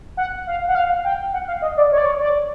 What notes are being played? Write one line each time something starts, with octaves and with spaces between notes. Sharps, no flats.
F#5
F5
F#5
F5
G5
F#5
F5
D#5
D5
C#5
D5
C#5
D5